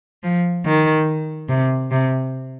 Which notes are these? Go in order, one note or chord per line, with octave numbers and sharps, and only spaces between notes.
F3
D#3
C3
C3